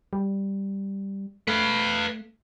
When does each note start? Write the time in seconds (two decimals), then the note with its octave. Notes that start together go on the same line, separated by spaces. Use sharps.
0.13 G3
1.48 A3 B4 F5